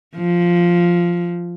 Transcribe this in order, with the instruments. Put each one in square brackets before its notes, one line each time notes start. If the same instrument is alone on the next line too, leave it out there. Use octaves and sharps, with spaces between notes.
[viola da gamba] F3